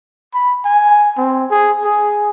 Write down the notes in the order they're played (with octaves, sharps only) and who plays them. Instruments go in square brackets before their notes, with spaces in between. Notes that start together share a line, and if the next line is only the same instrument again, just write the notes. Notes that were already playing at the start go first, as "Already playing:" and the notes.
[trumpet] B5
G#5
C4
G#4
G#4